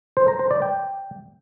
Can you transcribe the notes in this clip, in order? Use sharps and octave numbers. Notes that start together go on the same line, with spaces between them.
C5
A#5
C5
D5
G5